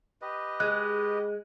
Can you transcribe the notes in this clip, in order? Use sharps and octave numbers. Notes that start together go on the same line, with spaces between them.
G4 B4 D#5
G#3 F#6